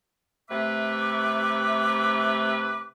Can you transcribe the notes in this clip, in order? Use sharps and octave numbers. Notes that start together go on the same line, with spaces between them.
C3 A3 B4 E5 D6